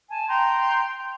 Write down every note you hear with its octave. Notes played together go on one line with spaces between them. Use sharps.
G#5 A5
G5 A#5 C6 G6